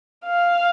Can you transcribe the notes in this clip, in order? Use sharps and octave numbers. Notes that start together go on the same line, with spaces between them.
F5